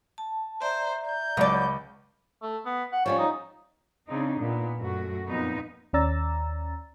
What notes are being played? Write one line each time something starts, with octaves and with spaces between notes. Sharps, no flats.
A5
C5 D5 E5 A#5
G6
C#2 F#3 D5 B5
A3
B3
F#5
F3 G3 C#4 C#5
D#4
C#3 C4 D4 D#4
A#2 B3
F#2 A3 F#4
F2 A#2 B3 D#4
D#2 C#4 D5 A#5 E6 A6